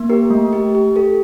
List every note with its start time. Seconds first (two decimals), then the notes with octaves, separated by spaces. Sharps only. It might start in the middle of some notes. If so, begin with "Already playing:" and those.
Already playing: A#3
0.10 G4 A#4
0.30 A3
0.53 G4
0.75 G4
0.96 G4 A4